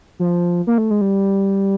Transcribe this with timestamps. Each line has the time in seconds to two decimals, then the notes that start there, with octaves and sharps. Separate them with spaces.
0.19 F3
0.67 A#3
0.78 A3
0.91 G#3
1.01 G3